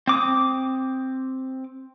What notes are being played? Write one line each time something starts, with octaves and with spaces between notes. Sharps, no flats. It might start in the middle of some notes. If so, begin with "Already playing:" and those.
C4 D6 D#6